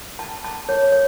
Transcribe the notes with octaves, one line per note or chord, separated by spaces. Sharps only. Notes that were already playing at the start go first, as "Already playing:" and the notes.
A5
A5
C#5
C#5